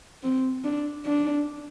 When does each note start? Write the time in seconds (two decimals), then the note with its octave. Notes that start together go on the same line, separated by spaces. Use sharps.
0.23 C4
0.64 D4
1.05 D4